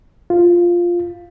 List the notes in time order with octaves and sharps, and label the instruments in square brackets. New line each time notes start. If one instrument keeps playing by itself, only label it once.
[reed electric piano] F4